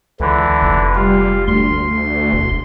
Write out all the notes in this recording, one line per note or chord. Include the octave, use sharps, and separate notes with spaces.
C#2 D3 E3
F1
G3 F4
D2 C6
E1